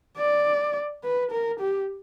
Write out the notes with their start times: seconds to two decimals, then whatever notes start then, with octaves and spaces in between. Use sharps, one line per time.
0.18 D5
1.04 B4
1.31 A#4
1.60 G4